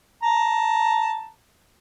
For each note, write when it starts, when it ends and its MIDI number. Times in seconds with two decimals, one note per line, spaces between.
0.23 1.28 81
0.23 1.28 82